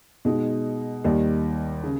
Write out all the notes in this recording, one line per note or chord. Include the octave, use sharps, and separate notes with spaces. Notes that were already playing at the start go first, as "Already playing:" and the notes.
B2 G#3 D#4
D#2 D#3 G3
C#3